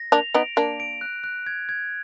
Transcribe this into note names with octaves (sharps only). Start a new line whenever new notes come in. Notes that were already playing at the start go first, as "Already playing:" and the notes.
Already playing: A#6
A#3 D4 F7
B3 D#4 D7
A#3 D4 D7
D7
F#6
F#6
G#6
G#6